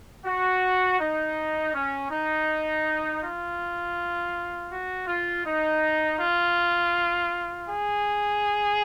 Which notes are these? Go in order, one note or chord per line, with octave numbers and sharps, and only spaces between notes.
F#4
D#4
C#4
D#4
F4
F#4
F4
D#4
F4
G#4